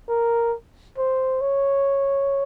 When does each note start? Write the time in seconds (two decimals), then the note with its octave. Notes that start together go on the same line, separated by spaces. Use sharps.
0.09 A#4
0.98 C5
1.41 C#5